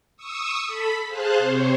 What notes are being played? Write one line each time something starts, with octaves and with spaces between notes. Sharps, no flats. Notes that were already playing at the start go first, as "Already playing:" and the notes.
C#6 D#6 E6
A4 B5 B6
G#4 C5 F5 A5 F#6
C3 C5 C#5